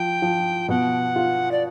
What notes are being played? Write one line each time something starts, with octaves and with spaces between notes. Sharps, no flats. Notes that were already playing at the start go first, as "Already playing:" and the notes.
Already playing: F3 G5
F3
B2 F#5
F4
D5